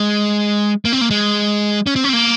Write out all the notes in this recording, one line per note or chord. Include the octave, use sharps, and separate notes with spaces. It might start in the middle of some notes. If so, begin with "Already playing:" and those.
Already playing: G#3
A#3
C4
A#3
G#3
C#4
C4
C#4
C4
A#3